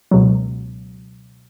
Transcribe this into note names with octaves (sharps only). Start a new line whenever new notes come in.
C#2 B2 F#3